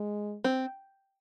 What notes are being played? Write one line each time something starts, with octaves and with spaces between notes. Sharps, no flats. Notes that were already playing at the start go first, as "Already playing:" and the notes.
Already playing: G#3
C4